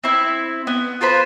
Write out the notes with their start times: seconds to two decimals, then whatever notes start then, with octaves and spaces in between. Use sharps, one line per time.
0.04 C4 E4
0.67 B3
1.01 F4 B4 C5 B5